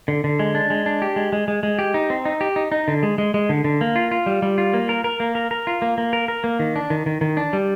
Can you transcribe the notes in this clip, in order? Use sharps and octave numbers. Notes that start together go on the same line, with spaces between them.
D3
D3
G#3
D4
G#3
D4
G4
G#3
G#3
G#3
G#3
G4
D#4
C4
D#4
G4
D#4
D#4
D3
G#3
G#3
G#3
D3
D3
A#3
F4
F4
G3
G3
F4
A#3
A#4
A#4
A#3
A#4
A#4
F4
A#3
A#3
A#4
A#4
A#3
D#3
D4
D#3
D#3
D#3
D4
G3